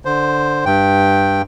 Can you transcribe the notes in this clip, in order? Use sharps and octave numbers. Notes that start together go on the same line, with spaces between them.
D3 C5
G2 G5